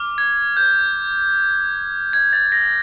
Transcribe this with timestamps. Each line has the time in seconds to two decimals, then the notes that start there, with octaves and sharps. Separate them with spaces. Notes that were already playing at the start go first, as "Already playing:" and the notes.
Already playing: D6 F6
0.18 G#6
0.57 G6
2.13 G#6
2.33 A6
2.52 A#6